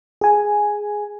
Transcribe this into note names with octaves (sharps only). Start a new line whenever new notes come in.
G#4 G#5